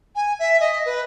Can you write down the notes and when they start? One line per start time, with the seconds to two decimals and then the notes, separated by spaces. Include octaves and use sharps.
0.15 G#5
0.39 E5
0.59 D#5
0.85 B4